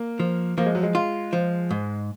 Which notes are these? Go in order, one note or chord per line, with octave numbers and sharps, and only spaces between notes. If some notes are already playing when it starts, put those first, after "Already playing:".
Already playing: A#3
F3
F3 A#3
G#3
F#3
G#3
F4
F3
G#2